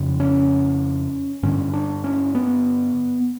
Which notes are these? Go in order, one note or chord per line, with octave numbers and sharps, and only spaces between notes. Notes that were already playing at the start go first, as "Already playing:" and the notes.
Already playing: F2 C#3
C#4
G2 D3 C#4
D4
C#4
B3